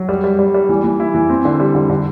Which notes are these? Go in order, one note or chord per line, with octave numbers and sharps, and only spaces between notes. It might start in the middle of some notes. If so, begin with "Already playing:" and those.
Already playing: F#3
G3
G3
G3
G3
E3
E3
E4
E3
C4
D3
G3
D3
D3